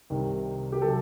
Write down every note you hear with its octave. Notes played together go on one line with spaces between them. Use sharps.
C2 C3 D#3 G3
G4
C3 F#3 A4